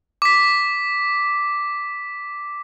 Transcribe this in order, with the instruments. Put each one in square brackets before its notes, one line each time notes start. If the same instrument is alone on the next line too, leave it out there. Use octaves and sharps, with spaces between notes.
[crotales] D6 B6